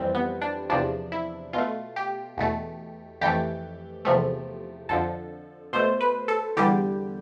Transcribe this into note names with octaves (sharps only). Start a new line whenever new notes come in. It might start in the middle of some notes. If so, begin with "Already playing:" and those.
Already playing: F2 E3 G3 C4
B3
D4
E2 C3 F3 D4
E4
B2 A3 F4
G4
E2 B2 A3
F2 E3 A3 G4
E2 C3 F3 A3
F2 D3 F3 A4
B2 A3 C5
B4
A4
E2 D3 G3 G4